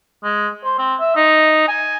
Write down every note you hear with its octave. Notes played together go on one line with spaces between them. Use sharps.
G#3
C5
C4
E5
D#4
G#5